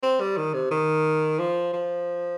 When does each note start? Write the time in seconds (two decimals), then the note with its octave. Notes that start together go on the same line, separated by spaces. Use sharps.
0.03 C4
0.21 G3
0.37 D#3
0.54 C3
0.71 D#3
1.39 F3
1.73 F3